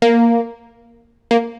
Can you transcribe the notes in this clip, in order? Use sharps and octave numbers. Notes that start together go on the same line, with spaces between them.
A#3
A#3